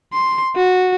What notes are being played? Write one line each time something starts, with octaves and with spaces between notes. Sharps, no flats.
C6
F#4